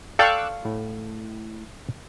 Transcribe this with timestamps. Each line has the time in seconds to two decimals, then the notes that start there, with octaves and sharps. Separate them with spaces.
0.19 A4 D5 F5 G5 C#6 D6 E6 F#6
0.65 A2